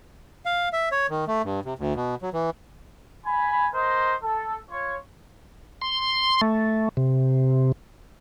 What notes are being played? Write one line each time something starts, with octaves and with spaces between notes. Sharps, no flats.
F5
E5
C#5
D#3
A3
G2
C3
D2
B2
F#3
E3
G#5 B5
A#4 C5 D#5
A4
F4 C#5
C6
A3
C3